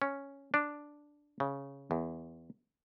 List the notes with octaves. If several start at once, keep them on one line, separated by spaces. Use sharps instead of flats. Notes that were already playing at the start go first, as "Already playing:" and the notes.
C#4
D4
C#3
E2